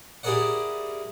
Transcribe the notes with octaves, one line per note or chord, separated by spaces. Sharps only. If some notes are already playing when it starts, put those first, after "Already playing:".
E4 G4 G#4 A#4 D5 F#5